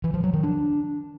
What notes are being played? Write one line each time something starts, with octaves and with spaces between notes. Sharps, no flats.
E3
F3
F#3
D#3
D4